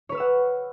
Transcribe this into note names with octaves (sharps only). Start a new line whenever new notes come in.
B4 C#5 F#5 E6 F6